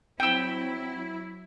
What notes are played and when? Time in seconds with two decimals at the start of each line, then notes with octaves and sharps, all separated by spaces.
0.20 F#3 C4 E4 G5 E6